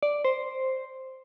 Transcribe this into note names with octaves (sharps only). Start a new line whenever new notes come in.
D5
C5